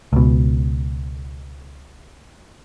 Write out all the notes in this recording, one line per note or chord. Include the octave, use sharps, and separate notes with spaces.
C#2 B2